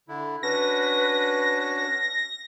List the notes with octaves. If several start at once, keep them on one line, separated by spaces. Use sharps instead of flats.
D3 E4
C#4 D4 F#4 B4 A#6